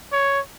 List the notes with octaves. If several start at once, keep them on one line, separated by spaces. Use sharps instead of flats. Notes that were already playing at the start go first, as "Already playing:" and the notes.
C#5